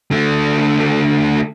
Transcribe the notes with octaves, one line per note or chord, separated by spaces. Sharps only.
D3 A3